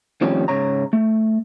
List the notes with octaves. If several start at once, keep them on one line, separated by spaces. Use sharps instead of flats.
D#3 F3 G3 A3 C4 C#4
G#2 C#3 C#5 A#5
A3